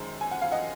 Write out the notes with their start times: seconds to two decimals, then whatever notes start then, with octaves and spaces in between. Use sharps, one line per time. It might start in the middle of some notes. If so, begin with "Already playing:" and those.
Already playing: F#2 D#3 G#3 C5
0.21 G#5
0.31 F#5
0.42 F5
0.51 D#5 F#5